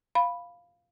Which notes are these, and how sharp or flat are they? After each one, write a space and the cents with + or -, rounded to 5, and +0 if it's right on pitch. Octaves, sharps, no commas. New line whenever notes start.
F5 +0 B5 +0